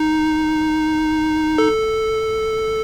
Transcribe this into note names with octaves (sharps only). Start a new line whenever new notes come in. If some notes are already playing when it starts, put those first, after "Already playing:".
Already playing: D#4
A4